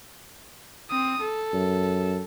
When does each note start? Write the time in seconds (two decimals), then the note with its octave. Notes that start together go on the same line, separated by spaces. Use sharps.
0.90 C4 D#6
1.21 A4
1.54 F#2